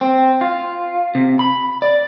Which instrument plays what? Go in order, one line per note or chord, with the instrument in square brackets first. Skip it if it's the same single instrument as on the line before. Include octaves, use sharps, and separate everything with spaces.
[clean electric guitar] C4
F4
C3
B5
D5